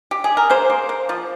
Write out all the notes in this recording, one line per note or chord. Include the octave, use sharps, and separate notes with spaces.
G4
G#4
A#4
A#3 G#4 C5
A#3
A#3
F3